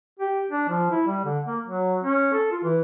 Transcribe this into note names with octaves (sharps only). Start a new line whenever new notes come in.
G4
D4
F3
E4
G3
D3
A#3
F#3
C#4
A4
F4
E3